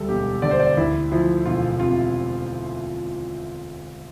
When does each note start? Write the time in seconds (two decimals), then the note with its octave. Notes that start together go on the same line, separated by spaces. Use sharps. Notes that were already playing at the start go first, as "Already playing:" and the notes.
Already playing: D2 G3 A4
0.08 E1 G4
0.42 D3 D5
0.51 C5
0.60 D5
0.77 D2 E4
1.12 F3 E4
1.45 E1 F4
1.80 C3 F4